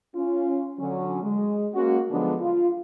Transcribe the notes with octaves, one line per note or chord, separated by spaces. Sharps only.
C#4 F4
D3 F#3 C#4
G#3
G#3 A#3 C#4 F#4
D3 F3 F#3 G#3 B3 D4
F4